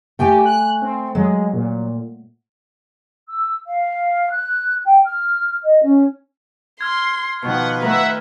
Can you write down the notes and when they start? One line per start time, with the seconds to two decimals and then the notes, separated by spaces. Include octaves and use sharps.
0.19 A3 G4 G5 G#5
0.46 F#6
0.82 C4
1.15 F#3 G#3
1.53 A#2
3.29 E6
3.68 F5
4.31 F#6
4.85 G5
5.05 F6
5.64 D#5
5.83 C#4
6.81 C6 F6 G#6
7.42 B2 D#3 F3 B4 F#5
7.82 D#3 A3 A#4 E5 F#5